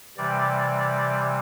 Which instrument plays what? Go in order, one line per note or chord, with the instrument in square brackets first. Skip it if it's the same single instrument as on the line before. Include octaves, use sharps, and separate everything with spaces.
[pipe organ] C3 E3 G3 D5